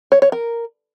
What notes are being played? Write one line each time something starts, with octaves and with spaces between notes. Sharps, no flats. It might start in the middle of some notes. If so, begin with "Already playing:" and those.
C#5
C#5
A#4